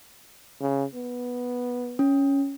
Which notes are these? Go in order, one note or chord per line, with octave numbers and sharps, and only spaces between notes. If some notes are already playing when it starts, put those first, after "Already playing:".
C#3
B3
C#4